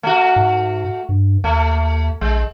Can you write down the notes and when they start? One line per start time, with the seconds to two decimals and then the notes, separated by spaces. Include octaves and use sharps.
0.03 A3 F#4
0.36 G#2
1.09 G2
1.44 D#2 A3
2.21 A#1 G#3